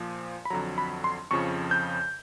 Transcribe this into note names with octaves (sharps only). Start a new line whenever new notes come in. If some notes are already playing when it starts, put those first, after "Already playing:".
Already playing: A#2 F3
B5
F2 D3 F#3 A#5
B5
C6
F2 C#3 F3 C#6
G6